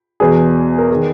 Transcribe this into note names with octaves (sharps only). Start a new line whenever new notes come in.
E2 B2 G#4
A#4
D#3 G#4